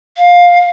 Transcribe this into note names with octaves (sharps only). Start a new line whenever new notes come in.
F5